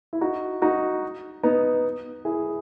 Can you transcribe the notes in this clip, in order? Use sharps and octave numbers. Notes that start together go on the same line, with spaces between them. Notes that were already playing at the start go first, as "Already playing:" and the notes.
E4
D#4 F#4
D#4 F#4
B3 D#4
E4 G#4